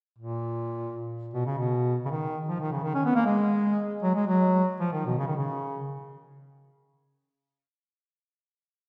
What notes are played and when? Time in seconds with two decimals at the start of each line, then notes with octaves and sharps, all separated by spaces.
0.18 A#2
1.34 B2
1.46 C#3
1.58 B2
2.05 C#3
2.11 D#3
2.49 F3
2.60 D#3
2.72 C#3
2.83 D#3
2.95 C#4
3.05 B3
3.15 A#3
3.26 G#3
4.03 F#3
4.15 G#3
4.27 F#3
4.80 F3
4.93 D#3
5.06 B2
5.18 C#3
5.27 D#3
5.36 C#3